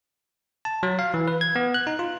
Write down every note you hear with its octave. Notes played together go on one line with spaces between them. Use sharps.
A5
F#3
F5
E3
B4
G#6
B3
F#6
D#4
F4